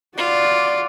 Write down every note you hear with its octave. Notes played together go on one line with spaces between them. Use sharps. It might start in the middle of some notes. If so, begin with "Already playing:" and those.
F4 F#4 D5